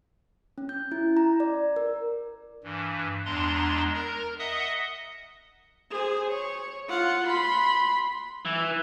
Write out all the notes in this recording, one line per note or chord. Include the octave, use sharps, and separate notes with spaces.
C#4
G6
E4
A#5
D5
A#4
G2 E3
E2 G#3 D4 A#5 C6
A#4 A#5
D#5 E5 F#5 D#6
G#4 C5
C#5
F4 F#5
B5 C6
E3